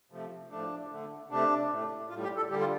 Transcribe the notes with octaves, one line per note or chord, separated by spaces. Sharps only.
C3 F3 A3
A2 F3 A3 D4
D3 A3
C3 A3 D4
A2 A3
A2 G3 F4
G4
A4
D3 G3 G4
F4